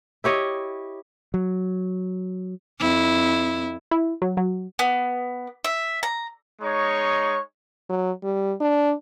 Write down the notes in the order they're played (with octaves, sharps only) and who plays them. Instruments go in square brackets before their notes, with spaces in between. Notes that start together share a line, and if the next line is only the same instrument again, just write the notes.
[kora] E4 G4 C#5 D#5
[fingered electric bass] F#3
[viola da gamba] F2 E4
[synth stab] E4
F#3
F#3
[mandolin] B3
E5
A#5
[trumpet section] G#3 D#4 C#5 C#6
[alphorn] F#3
G3
D4